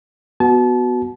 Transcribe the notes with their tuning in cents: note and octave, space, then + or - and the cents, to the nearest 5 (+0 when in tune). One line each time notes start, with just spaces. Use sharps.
B3 +0 F#4 +0 A5 -30